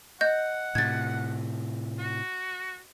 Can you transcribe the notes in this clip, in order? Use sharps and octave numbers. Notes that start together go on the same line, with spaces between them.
D#5 F#5 G6
A2 C3 G#6 A6
F#4